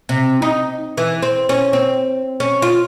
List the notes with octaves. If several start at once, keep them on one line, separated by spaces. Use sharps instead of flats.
C3
D#4
E3
C4
C#4
C4
C#4
F4